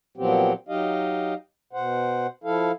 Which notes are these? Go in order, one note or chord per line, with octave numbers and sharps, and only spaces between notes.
A#2 F3 F#3 B3 C4 G4
F#3 D#4 G4 D#5 F5
B2 C5 F#5
F3 E4 A4 F5